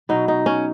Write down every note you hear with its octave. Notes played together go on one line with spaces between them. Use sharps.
B2 F#3 D#4
D#4
C#4